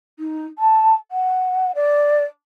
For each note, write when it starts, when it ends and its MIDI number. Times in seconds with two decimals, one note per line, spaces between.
0.19 0.45 63
0.58 0.94 81
1.11 1.71 78
1.75 2.24 74